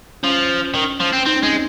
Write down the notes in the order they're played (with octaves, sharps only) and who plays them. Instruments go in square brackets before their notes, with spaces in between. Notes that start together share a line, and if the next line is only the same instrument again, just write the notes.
[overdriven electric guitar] F3 [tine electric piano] C#4
[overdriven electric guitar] D#3
F3
C4
[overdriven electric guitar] C4 [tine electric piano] D#4
[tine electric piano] C#4
[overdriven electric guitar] G#3 [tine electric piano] C4